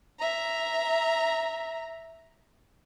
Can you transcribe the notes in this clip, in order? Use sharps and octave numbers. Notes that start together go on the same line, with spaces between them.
E5 A#5